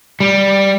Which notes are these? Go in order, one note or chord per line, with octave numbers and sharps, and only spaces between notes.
G3